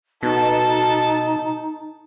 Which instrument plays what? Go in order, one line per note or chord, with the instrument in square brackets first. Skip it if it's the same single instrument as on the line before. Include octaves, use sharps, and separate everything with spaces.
[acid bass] B2 [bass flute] D#4 [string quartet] A4 A5